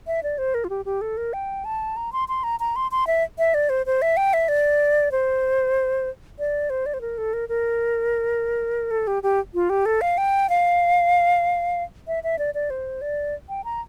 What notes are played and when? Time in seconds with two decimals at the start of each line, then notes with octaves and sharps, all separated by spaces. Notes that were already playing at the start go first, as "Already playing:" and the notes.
0.07 E5
0.23 D5
0.38 C5
0.54 A#4
0.64 F4
0.70 G4
0.85 G4
1.01 A4
1.17 A#4
1.33 G5
1.65 A5
1.96 A#5
2.13 C6
2.28 C6
2.44 A#5
2.60 A#5
2.76 C6
2.91 C6
3.07 E5
3.38 E5
3.54 D5
3.69 C5
3.86 C5
4.02 E5
4.17 G5
4.33 E5
4.48 D5
5.12 C5
6.39 D5
6.70 C5
6.86 D5
6.94 C5
7.01 A#4
7.18 A4
7.33 A#4
7.49 A#4
8.91 A4
9.07 G4
9.23 G4
9.54 F4
9.70 G4
9.86 A4
10.01 F5
10.18 G5
10.49 F5
12.07 E5
12.24 E5
12.39 D5
12.54 D5
12.70 C5
13.01 D5
13.49 G5
13.64 A#5